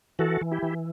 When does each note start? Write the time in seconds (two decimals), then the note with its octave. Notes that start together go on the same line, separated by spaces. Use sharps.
0.19 E3 F#4 A4
0.41 E3
0.52 E4 G4
0.63 E3